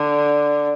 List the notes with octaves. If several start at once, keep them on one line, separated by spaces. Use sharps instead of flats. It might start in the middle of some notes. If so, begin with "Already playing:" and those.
Already playing: D3